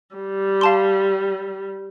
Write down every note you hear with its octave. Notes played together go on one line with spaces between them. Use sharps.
G3
F5 A5 C6